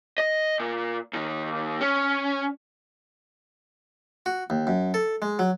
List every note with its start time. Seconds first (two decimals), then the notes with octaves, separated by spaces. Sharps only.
0.18 D#5
0.60 A#2
1.13 D#2 D#3
1.81 C#4
4.26 F#4
4.50 D#2
4.67 F#2
4.94 A4
5.22 G#3
5.39 F#3